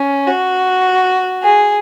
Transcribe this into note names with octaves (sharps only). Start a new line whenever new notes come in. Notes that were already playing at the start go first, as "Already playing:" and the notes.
Already playing: C#4
F#4
G#4